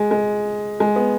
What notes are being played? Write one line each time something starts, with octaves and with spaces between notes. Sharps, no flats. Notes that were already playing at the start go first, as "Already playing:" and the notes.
Already playing: G#3
G#3
G#3
B3